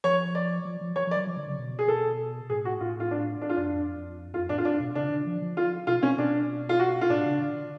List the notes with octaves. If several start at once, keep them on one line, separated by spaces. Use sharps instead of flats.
F3 C#5
D5
F3
F3
F3 C#5
F3
D5
F#3
F3
D3
C#3
B2
G#4
A4
A2 G#4
F#4
A2 F4
F4
D4
D4
F4
F#2 D4
F2
F#2 F4
A2 D4
F4
D4
B2
C#3 D4
D3
F3
F3
F4
B2 F4
B2 C#4
B2 D4
F4
F#4
F4
A2 D4
C#3
D3